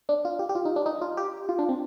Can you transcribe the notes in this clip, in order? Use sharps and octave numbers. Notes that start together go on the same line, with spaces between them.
D4
F4
G4
G4
F4
D#4
D4
D#4
F4
G4
F4
D4
C4